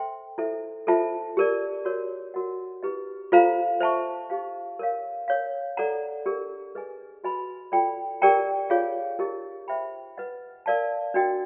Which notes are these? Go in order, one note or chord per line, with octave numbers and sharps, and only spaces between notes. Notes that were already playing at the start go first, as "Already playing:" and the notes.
Already playing: A4 C5 E5 G5 C6
E4 A4 C5 E5
F4 A4 C5 E5 A5
G4 A#4 D5
F#4 A#4 C#5
F#4 A#4 D#5 F#5
E4 G4 B4 D#5
F4 A4 C5 F5 A#5
C5 E5 A5 C#6
D#4 G4 C5 F5
A#4 C#5 F5
A#4 C#5 F5
A4 D5 F#5 A#5
D4 G4 A#4
G#4 B4 D#5 G#5
F#4 B4 D#5 G#5 B5
F4 A4 D5 G5 B5
G4 A#4 D5 G5 A#5
F4 G#4 C#5 F5
D#4 G4 A#4 D#5
C5 E5 G5 B5
B4 D#5 F#5
A#4 D5 F5 A5
D4 F#4 A#4 D#5 G5